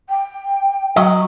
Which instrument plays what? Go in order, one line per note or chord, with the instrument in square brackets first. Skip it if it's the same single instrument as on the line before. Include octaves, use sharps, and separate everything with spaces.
[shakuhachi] G5
[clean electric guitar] F#3 D#5